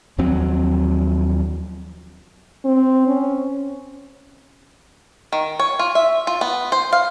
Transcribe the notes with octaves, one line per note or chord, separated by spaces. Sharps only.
D#2 F3 F#3 C4
C4
C#4
D#3
C#5
F4
E5
F4
B3
C5
F5